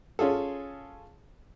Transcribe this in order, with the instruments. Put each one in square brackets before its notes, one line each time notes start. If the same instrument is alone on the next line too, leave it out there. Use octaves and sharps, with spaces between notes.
[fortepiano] C#4 F4 G#4 A4